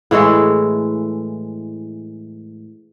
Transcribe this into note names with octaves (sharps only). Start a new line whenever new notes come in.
A2 E3 G#3 A4